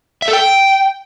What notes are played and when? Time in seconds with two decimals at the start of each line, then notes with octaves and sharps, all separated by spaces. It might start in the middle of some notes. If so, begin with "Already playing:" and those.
0.22 E5
0.28 A4
0.33 G5